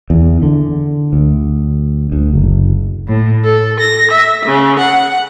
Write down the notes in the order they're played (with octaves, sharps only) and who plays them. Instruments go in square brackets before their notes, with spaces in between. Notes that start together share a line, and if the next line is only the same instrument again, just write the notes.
[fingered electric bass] E2
D3
D2
D2
F#1
[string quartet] A2
A4
A#6
E5
C#3
F#5